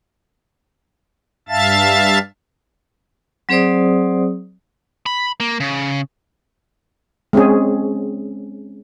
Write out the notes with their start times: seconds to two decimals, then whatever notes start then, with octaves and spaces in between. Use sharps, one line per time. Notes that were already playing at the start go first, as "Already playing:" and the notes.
1.49 G2 E5 F5 A5 A6
3.49 F#3 C4 G#4 C5 D5 D#6
5.06 B5
5.40 A#3
5.60 C#3
7.33 G#3 C4 C#4 G#4